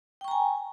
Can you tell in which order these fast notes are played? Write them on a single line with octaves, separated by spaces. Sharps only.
G5 C#6 A#5 G#5